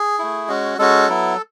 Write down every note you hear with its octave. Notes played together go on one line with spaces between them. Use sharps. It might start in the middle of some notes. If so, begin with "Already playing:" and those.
Already playing: G#4
A3 E4
G#3 C#4 F#4
G#3 C#4 F#4 A4
F#3 B3 E4